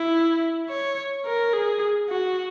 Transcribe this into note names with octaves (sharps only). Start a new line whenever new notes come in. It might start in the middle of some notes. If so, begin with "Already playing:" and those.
Already playing: E4
C#5
A#4
G#4
F#4